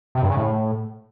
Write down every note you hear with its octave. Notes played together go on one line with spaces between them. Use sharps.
C3
G2
C#3
A2